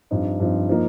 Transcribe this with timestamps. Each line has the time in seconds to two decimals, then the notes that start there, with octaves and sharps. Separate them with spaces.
0.11 G2 F3 C4 D#4
0.40 G2 F3 C4 D#4
0.69 F3 A#3 D#4